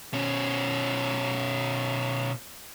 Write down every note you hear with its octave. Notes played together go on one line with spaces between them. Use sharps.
B2 C#4